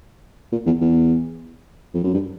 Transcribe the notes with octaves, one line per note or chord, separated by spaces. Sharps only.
A#2
E2
E2
F2
F#2
G2